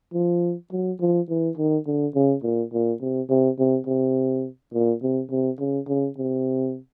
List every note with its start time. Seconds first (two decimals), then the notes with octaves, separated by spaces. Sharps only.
0.14 F3
0.72 F#3
1.01 F3
1.29 E3
1.57 D#3
1.87 D3
2.15 C#3
2.43 A#2
2.73 A#2
3.01 C3
3.30 C3
3.59 C3
3.87 C3
4.73 A#2
5.02 C3
5.30 C3
5.59 C#3
5.88 C#3
6.17 C3